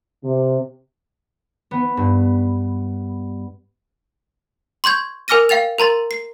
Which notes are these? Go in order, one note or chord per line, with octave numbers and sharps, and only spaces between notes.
C3
B3
G2
C6 C#6 G6 G#6
A#4 G#5 D6 F6 A#6 D#7
F5 G5 A6 F7
A#4 A#5 C6 A6
C7